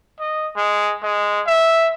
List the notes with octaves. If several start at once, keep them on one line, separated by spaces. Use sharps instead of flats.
D#5
G#3
G#3
E5